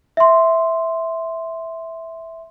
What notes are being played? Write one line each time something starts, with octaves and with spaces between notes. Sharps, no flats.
E5 C6